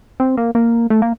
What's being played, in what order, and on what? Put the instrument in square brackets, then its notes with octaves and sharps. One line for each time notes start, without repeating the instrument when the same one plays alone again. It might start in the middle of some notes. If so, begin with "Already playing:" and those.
[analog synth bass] C4
A#3
A#3
A3
A#3